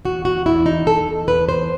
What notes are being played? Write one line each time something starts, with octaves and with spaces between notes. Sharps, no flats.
E2 F#4
F#4
E2 E4
D#4
E2 A4
E2 B4
C5